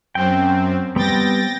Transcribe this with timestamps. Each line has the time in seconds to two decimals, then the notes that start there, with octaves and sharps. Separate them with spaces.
0.15 F#2 C4 G5
0.96 G3 B3 C4 G5 A6 A#6